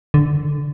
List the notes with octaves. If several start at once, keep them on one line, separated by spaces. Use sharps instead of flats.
D3